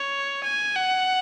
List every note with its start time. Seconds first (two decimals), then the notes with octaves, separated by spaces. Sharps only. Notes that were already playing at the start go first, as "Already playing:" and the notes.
Already playing: C#5
0.44 G#5
0.76 F#5